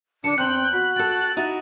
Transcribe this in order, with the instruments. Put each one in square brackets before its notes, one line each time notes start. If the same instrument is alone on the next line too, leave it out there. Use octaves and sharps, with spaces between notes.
[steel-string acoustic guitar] D3 A5 [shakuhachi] D4 [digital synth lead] C#7
[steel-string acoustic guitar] E2 [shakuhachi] C4 [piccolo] G5 [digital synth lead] F#6
[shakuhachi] F#4 [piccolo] B5
[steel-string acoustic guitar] A4 G5 [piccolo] A6
[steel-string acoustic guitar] D#4 E4 F#4